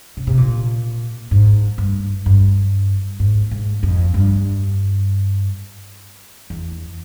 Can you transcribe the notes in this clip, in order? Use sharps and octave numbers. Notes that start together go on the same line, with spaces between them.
C#3
C3
A#2
G#2
G2
G2
G#2
G#2
F2
G2
E2